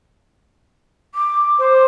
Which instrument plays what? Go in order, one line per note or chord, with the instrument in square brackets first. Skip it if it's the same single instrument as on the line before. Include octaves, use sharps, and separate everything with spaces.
[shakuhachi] D6
[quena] C5